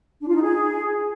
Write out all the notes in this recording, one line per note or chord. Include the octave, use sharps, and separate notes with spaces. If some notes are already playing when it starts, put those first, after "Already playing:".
D4
F4
D#4
G#4